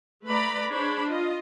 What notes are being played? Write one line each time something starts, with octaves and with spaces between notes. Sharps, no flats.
A3 B4 D5 A#5 B5
D4 G#4 C5 C#5 B5
F4 D#5